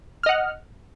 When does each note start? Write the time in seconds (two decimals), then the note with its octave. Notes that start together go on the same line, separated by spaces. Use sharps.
0.23 F6
0.26 D#5
0.29 F#5